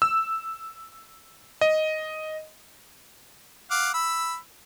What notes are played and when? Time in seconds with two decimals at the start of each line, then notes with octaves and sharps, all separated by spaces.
0.02 E6
1.61 D#5
3.71 F5 F#5 D6
3.94 B5 E6